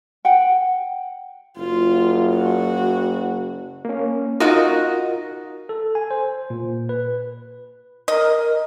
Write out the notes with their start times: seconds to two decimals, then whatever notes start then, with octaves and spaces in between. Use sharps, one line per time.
0.25 F#5 G5
1.57 F#1 F4
2.35 F#4
3.85 A#3 C#4
4.40 D#4 F4 F#4 A#4 D#5
5.69 A4
5.95 G#5
6.11 C5
6.50 A#2
6.89 B4
8.08 A#4 D#5